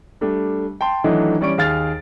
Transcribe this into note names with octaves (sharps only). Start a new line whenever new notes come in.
G3 A3 D4
G5 A5 C6
D#3 E3 F#3 A3 D4 D#4
E3 G3 C#4 D5 C#6 D7
D#2 G#4 F5 F6 A6